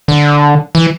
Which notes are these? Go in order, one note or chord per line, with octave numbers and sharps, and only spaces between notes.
D3
E3